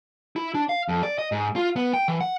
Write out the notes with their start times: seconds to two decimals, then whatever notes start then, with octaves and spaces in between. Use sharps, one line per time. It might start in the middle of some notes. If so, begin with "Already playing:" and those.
0.36 E4
0.55 D4
0.69 F5
0.89 F2
1.03 D5
1.18 D#5
1.32 G#2
1.56 F4
1.76 B3
1.94 G5
2.08 E3
2.21 F#5